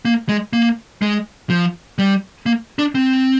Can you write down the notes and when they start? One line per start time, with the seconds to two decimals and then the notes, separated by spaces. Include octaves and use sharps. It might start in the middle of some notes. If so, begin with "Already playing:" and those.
0.05 A#3
0.29 G#3
0.53 A#3
1.02 G#3
1.50 F3
1.98 G3
2.46 A#3
2.79 D4
2.95 C4